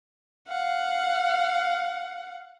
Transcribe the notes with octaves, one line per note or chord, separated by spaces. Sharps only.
F5 F#5